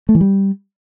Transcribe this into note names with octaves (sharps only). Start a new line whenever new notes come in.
A3
E3
G3